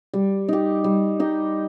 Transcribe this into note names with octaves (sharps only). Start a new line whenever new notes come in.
G3
D#4 G4
G3
D#4 G4